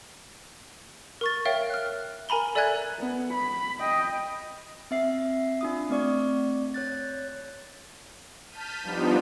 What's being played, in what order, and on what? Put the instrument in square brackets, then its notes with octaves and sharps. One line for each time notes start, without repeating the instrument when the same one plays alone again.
[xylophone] A#4 C#6 A6
A#4 C#5 E5 F5 G5
F6 F#6
A#4 G#5 A#5 B5 G7
A4 D5 E5 G#5 F#6 G#6
[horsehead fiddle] B3
B5
D#5 G5
[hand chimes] C4 E5 C7
D4 F4 D#6
A3 C4 D5 C#6
C#5 F#6 A6
[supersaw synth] A5 F6 G6 B6 D#7
F3 G3 B3 D4 D#4 F4